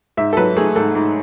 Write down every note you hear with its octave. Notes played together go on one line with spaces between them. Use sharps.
G#2 E5
A4
F#3 B4
A3 G#4
G#2 A4
G#2